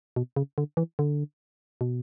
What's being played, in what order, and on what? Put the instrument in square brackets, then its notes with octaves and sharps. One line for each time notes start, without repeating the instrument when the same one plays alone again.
[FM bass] B2
C#3
D3
E3
D3
B2